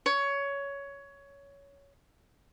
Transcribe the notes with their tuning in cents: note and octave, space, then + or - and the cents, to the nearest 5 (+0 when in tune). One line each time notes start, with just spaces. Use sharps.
C#5 +15